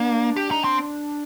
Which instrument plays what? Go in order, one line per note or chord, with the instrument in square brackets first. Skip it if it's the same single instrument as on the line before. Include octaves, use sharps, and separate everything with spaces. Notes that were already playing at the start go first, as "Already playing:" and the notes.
Already playing: [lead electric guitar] A#3 [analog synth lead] D4
[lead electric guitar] G4
D#4
C4